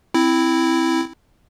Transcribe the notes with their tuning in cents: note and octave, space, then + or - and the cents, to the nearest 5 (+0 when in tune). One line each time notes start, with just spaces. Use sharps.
C4 +0 E4 +0